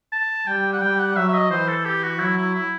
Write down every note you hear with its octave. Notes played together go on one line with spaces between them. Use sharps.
A5
G3 G5
F#5
G3 G5
F#5
F#3 E5
E5
D#5
E3 C5
A4
G4
F#4
F#3 E4
E4
E4